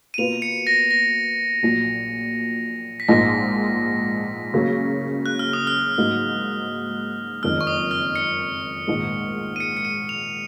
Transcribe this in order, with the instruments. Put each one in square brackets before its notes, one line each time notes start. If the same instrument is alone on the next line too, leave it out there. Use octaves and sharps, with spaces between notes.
[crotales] D#7
[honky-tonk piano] B2 A#3 F4 B4 [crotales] F7
[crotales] C#7
A#6
A#6
[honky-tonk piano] A#1 A#2 F#3
[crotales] B6
[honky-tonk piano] A#1 G#2 F3 A#3 D#4 [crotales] A#6
[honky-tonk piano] C#3 F#3 A#3 C#4
[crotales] F#6
F6
D#6
F6
[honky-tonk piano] G#2 F#3 A#3 D#4
[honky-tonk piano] F#1 F2 D#3 G#3 [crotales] F6
[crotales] C#6
D#6
F6
C#7
[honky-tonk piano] A#1 G#2 D#3 G#3
[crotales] D#7
C#7
C#7
D#7
F7